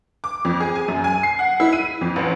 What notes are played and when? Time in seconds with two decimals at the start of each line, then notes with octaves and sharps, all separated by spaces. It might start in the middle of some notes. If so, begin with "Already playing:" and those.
0.24 D6
0.45 F2
0.60 G#4
0.75 G#5
0.88 F#2
1.04 G#5
1.23 C7
1.39 F#5
1.60 E4
1.73 D#7
2.01 F2
2.16 A1